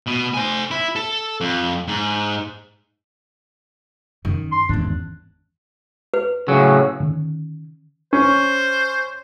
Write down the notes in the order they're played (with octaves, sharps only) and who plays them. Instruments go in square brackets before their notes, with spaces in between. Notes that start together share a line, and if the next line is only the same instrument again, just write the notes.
[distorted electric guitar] B2
C5 G#5
E4
A4
F2
G#2
[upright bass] F#2 [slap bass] D#3
[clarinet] C6
[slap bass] G#1 E2 G2 [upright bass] D#3 C#4 [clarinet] D4
[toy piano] B4
[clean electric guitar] A2 F#3 [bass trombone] C#3
[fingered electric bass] D3 D#3 G#3 C#4
[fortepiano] C#4 [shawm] C5